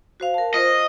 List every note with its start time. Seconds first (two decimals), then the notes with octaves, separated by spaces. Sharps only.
0.20 F#4 C5 F5
0.34 A#4 A5
0.54 F4 C5 D#5